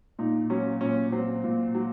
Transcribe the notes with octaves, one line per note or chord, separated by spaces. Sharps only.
A#2 D#4
F#3 C#4
A#2 C#4
F#3 C4
A#2
F#3